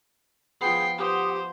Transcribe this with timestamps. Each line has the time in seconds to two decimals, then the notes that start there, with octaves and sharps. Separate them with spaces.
0.61 F3 B3 G#4 G5 C7
0.98 G4 B4 C5 F#5 D#6